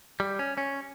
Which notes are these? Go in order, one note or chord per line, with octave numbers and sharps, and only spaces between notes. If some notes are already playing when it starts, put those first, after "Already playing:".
G3
C#4
C#4